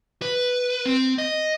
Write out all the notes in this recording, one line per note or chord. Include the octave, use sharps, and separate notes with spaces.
B4
C4
D#5